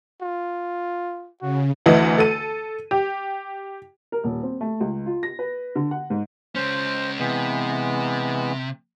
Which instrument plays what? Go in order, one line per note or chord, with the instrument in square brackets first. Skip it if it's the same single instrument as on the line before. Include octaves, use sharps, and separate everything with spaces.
[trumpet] F4
[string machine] C#3 [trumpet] F#4
[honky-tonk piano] D2 E3 D#5
A4 D#7
G4
[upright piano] A#4
D#1
C4
A3
C#2
F4
A#6
B4
D3
F#5
G#2
[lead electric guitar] G#3 C#4 [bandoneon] C5
[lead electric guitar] C3 [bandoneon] E3 G#3 B3